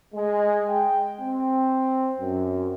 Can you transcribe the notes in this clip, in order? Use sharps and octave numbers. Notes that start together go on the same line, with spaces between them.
G#3
G5
C4
F#2